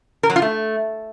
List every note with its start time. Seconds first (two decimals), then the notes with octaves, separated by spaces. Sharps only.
0.23 A#4
0.30 F#3
0.36 F4
0.42 A3